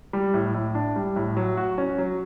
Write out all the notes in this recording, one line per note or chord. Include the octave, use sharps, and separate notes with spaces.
G3
A2
A2
D4
G3
A2
F#3
F#4
C#4
F#3